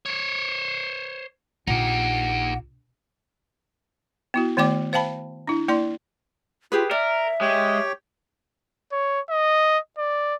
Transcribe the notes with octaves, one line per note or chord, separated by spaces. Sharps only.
C5 C#5
A#1 D#4 G4 F#5
B3 E4 F#4
D#3 A3 B3 D5 G5 D6
C5 F5 G5 A5 B5
D4 E4
A#3 E4 D5 C6
F4 G4 G#4 B4
A#4 D5 E5
G#3 G4 C#5 G5
C#5
D#5
D5